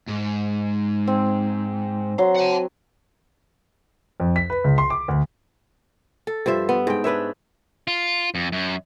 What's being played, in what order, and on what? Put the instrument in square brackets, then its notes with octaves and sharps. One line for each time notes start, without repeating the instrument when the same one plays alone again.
[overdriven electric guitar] G#2
[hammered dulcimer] C4
F#3 C6
[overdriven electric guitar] F#5 A5
[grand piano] F2
B6
B4
C#2
C6
D6
D2
[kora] A4
G2 F3 C5 E5
B3
G#2 G5
D4 B4 C#5 E5
[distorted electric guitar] F4
F2
F#2